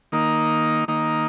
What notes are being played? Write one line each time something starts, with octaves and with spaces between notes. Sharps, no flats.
D#3 A#3 D#4
D#3 A#3 D#4